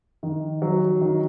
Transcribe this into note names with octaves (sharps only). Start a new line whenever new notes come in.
D#3
F#3
D#3